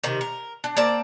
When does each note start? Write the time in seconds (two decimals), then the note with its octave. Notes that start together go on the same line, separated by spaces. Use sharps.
0.03 C3 D#3
0.21 A#4
0.64 D4
0.77 A#3 C4 D5 A5